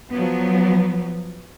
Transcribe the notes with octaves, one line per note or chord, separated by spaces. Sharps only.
F3 F#3 B3